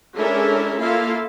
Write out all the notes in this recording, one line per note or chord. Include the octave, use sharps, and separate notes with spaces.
G#3 C#4 D4 E4 A4 A#4
A#3 E4 F4 A4 F5